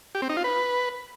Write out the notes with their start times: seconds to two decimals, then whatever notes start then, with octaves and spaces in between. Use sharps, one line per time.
0.15 G4
0.22 C4
0.29 D#4
0.37 F4
0.44 B4